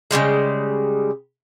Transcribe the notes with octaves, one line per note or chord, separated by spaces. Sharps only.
C#3 E3 G3 G#3